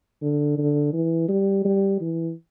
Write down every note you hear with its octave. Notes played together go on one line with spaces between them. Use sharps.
D3
D3
E3
G3
G3
E3